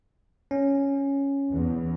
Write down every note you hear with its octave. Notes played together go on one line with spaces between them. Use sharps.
C#4
E2